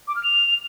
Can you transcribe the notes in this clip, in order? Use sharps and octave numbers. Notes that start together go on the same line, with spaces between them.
D6
F6
F7